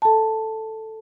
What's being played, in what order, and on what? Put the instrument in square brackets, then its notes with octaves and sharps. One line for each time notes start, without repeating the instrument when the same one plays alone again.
[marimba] A4 A5